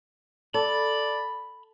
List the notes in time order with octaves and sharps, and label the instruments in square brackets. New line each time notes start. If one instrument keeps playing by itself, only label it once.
[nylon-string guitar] A4 [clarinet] D5 [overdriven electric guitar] B5